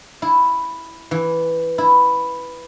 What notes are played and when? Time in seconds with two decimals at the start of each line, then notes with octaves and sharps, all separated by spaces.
0.22 E4
1.11 E3
1.78 E4